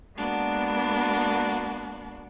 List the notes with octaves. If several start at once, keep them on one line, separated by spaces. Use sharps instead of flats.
G#3 A#3 B3 D4 F#4